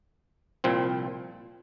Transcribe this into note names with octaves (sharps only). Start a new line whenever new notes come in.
C2 A#2 F3 C4